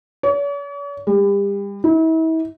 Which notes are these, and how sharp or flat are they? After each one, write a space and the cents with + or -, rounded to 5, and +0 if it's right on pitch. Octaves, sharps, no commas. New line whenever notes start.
C#5 +45
G3 +35
E4 -40